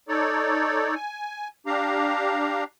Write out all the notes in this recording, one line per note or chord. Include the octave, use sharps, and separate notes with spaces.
D#4 A4 C#5 D5
G#5
D4 G4 F5 A#5